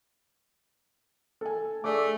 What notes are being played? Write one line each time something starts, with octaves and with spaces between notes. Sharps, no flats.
A4 G#5
A3 G#4 D5 D6